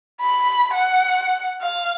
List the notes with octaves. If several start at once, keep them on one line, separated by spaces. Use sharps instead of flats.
B5
F#5
F5